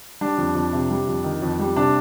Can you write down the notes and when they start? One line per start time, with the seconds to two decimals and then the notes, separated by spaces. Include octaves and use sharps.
0.21 G3 D4
0.38 F2
0.55 F2
0.73 C3
0.91 G3
1.08 F2
1.24 D#3
1.42 F2
1.59 G3
1.76 C3 D4